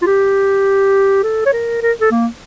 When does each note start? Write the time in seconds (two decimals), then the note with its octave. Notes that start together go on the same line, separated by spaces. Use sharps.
0.02 F4
0.07 G4
1.24 A4
1.46 C#5
1.53 A#4
1.82 A#4
2.01 A4
2.11 A#3